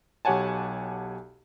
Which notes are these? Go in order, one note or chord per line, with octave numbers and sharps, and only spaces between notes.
B1 G4 C#5 F#5 G#5 A5